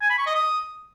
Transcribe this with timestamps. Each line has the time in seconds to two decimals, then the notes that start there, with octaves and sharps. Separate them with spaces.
0.02 G#5
0.10 B5
0.18 C#6
0.27 D#5
0.35 D#6